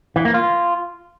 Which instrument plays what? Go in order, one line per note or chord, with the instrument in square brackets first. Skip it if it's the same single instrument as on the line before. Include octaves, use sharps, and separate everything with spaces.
[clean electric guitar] E3
A#3
F4